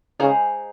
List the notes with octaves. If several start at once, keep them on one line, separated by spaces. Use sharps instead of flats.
C#3 G#3 D#4 G#4 C5 F5